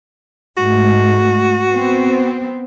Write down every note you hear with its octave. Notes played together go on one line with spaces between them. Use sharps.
G#2 G#3 A3 F#4
B3 C4